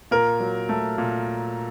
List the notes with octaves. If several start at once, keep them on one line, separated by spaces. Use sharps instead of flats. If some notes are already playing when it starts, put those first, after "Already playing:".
A#2 A#4
F#3
A3
A#2